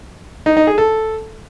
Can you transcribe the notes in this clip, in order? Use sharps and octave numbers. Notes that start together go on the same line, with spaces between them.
D#4
D#4
G#4
A4